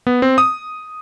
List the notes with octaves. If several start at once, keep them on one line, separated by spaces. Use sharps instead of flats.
B3
C4
D#6